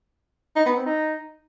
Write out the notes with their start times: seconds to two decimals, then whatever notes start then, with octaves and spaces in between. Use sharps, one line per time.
0.56 D#4
0.66 B3
0.76 C4
0.86 D#4